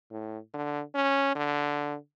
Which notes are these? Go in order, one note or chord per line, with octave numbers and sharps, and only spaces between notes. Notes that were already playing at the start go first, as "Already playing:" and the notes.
A2
D3
C#4
D3